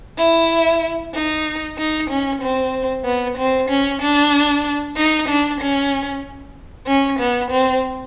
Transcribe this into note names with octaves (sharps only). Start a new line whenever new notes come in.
E4
D#4
D#4
C#4
C4
B3
C4
C#4
D4
D#4
D4
C#4
C#4
B3
C4